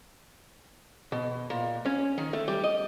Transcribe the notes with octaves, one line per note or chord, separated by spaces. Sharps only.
B2
A#2
C#4
D#3
A3
G3
D#5